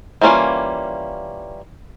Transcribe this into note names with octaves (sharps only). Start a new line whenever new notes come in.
E3 G3 A#3 C#4 F4